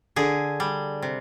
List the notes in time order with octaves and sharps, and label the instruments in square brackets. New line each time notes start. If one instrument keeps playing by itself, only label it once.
[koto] D3 G#4
G3
C3